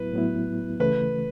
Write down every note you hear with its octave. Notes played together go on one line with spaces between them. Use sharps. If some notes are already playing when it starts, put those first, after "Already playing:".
Already playing: A2 F#3 B3 E4 B4
A2 F#3 B3 E4
C#3 E3 A3 B4